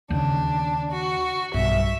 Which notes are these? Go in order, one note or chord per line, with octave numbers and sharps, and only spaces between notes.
D#2 C#3 D4
F#4
B1 G2 E5